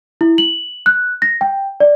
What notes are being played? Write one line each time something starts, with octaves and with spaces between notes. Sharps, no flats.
E4
F#7
F#6
A#6
G5
D5